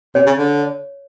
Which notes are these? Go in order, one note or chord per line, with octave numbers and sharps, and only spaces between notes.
C3 C#5
C#3
D3